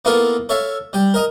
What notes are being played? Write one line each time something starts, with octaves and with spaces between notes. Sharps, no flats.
A#3 B3 E4 F4 A4 A#4
A4 C#5 E5 F5
G3 G5
A#4 D#5 A#5